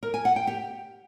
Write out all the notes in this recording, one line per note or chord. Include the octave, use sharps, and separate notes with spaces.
A#4
G#5
F#5
G5
G4